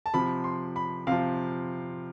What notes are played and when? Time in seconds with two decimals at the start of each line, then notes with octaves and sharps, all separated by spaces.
0.06 A5
0.14 C3 F3 B5
0.44 C6
0.76 B5
1.07 C3 F3 F5